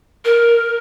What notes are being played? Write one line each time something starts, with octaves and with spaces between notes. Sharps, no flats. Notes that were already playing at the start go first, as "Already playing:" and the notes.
A#4